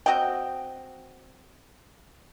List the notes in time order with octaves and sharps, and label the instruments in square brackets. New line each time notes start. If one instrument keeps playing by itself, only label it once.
[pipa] C4 F#4 D#5 G5